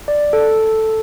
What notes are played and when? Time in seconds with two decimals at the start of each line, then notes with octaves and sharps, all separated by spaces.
0.08 D5
0.33 A4